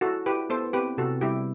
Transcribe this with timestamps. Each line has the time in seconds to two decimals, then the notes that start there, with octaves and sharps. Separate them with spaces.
0.01 E4 F#4 A4
0.26 E4 G4 B4
0.49 B3 A4 C5
0.73 C4 G4 B4
0.98 C3 F#4 A4
1.21 G3 E4 G4